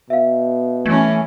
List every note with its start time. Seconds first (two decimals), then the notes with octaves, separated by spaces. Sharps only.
0.10 B2 E5 F5
0.86 E3 A3 C#4 G#6